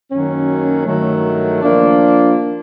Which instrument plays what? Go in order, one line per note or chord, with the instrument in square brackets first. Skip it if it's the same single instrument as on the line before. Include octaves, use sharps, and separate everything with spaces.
[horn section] F#2 D#3 F#3 A#3 C#4
G2 D#3 F#3 A3
F3 A#3 D4 F4